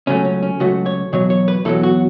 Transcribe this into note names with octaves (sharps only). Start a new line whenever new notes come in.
C#2 C#3 F#3 A3 C#4
C#4
C#4
C#2 C#3 F#3 A3 F#4
C#5
E2 B2 F#3 C#5
C#5
B4
E2 B2 F#3 A4
F#4